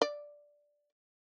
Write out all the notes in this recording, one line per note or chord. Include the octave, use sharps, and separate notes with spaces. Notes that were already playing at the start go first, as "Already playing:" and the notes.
D5